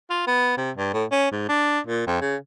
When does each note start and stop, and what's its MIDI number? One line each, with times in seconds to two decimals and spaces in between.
0.10 0.27 65
0.27 0.54 59
0.57 0.71 48
0.77 0.92 43
0.93 1.05 45
1.11 1.31 61
1.31 1.45 44
1.49 1.80 62
1.87 2.07 46
2.07 2.20 41
2.21 2.36 49